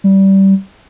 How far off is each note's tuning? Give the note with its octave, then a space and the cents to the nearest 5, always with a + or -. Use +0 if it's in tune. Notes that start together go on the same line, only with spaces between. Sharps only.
G3 -20